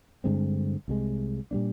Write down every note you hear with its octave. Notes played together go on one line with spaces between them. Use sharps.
G2 D3 G#3 C4
C2 C3 F3 G#3
A#2 G3 A#3 D4